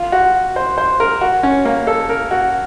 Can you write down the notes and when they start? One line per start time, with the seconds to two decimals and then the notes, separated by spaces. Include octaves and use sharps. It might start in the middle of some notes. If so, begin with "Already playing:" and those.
Already playing: F4
0.12 F#4
0.56 C5
0.78 C5
1.00 A#4
1.21 F#4
1.43 C#4
1.65 A#3
1.87 A4
2.09 A#4
2.31 F#4